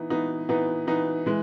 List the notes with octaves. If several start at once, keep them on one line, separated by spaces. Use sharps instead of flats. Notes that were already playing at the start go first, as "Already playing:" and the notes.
Already playing: E3 B3 D#4
E3 B3 D#4
E3 B3 D#4
E3 B3 D#4
E3 G#3